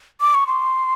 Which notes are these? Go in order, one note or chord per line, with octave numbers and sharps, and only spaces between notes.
D6
C#6
C6